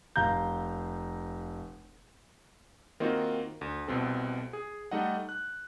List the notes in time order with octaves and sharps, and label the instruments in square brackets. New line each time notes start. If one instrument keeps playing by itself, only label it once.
[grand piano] F1 F5 A#5 G6
[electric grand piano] D#3 A#3 C4 F4 F#4 D#5
D2
C2 B2 C4 A4
G#4
G3 A3 D#4 D#5 F#5
F#6